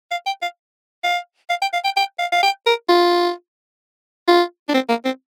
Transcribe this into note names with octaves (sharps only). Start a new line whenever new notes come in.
F5
G5
F5
F5
F5
G5
F5
G5
G5
F5
F5
G5
A#4
F4
F4
D4
C4
A#3
C4